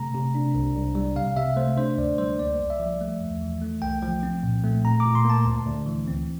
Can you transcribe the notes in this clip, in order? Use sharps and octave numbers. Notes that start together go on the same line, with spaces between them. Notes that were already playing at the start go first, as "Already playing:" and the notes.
Already playing: C3 A3 A#5
C3
D4
C2
C2
G3
C3 F5
C3 E5
A3 C5
D4 C5
D2 D5
G3 C5
A#3 D5
C2
E5
F3
A3
E2
E3
A3
C2 G5
F3 G5
C4
A#2
A3
A#2 A#5
A#2 D6
C6
A#3 A5
D2
D2
E3
C4